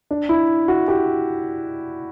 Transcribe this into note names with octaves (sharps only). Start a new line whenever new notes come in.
D4
E4
F#4
G4